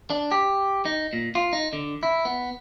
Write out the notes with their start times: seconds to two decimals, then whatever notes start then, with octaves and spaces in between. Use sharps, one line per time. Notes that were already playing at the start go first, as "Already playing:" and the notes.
0.10 D4
0.31 G4
0.85 D#4
1.13 A#2
1.35 F4
1.53 D#4
1.73 D3
2.03 E4
2.25 B3